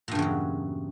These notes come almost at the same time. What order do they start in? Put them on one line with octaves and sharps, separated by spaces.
A#2 G2 C#3 E2 F#3